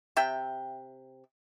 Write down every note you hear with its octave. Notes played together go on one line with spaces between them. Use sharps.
C3 E5 G5